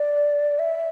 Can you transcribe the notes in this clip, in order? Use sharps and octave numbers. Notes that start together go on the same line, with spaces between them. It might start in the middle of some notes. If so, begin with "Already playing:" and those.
Already playing: D5
E5